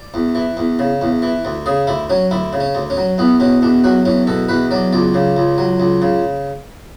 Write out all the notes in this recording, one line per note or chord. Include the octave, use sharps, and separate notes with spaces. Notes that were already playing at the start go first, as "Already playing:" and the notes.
Already playing: D5
E2
E3
E2
C#3
E2
E3
D2
C#3 G#4
D2 E4
F#3 C#4
D2 E4
C#3
C#4
D2
C#4
F#3
E2 B3
B2 C#4
E2 D4
F#3 F#4
E2 C#4
B2 A4
E2 B4
F#3 D5
C#2 D5
C#3
C#2
F#3
C#2
C#3